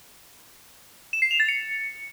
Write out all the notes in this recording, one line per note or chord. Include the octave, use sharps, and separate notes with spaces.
E7
C7
F7
A6
C#7